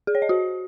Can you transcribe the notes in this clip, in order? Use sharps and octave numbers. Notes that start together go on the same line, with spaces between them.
G#4
C#5
D#5
F#4